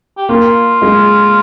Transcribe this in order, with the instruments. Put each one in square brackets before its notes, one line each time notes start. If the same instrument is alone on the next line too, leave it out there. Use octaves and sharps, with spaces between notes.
[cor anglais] G4
[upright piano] A#3 [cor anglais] F4
[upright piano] G#3